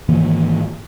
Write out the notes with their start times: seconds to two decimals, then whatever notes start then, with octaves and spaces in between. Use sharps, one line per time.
0.09 G#2 D#3 E3 A#3